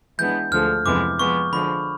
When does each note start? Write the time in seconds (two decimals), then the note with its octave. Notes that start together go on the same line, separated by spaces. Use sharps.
0.19 E3 G#3 B3 D4 G6
0.52 D2 D3 F3 G#3 F6
0.86 F2 C3 E3 G#3 B3 D6
1.19 F3 G#3 B3 C#6
1.53 D3 F3 G#3 B5